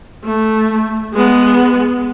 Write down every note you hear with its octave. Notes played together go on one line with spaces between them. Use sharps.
A3
G#3 B3